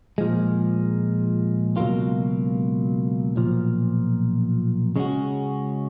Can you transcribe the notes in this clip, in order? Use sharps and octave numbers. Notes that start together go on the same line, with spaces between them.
A#2 F3 G#3
C#2 B2 F#3 A#3 F4
B1 A#2 F3
C#3 G#3 C#4 F#4